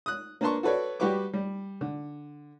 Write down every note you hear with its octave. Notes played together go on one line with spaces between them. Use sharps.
D#6 F#6
A#3 D4 B4 A5 C6 C#6
F#4 A4 B4 C#5 D5
G3 F#4 G4 B4 C#6 D6
G3
D3